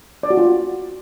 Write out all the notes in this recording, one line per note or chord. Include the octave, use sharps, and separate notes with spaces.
D5
F#4
F4